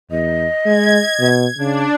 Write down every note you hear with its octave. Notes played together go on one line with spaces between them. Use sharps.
E2 D#5
G#3 G#6
B2
C#3 D4